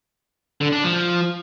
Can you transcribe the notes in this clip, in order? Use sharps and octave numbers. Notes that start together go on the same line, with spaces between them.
D3
D4
F3